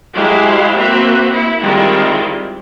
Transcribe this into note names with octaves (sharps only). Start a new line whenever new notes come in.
F#3 G#3 E4 G4 C5 F5
A#3 C4 F#4 B4 E5
E4
D#3 G3 G#3 C4 E4 F4